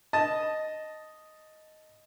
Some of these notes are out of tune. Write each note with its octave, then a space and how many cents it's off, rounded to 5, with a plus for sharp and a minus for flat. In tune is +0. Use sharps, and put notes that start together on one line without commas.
D#5 +0 A5 +0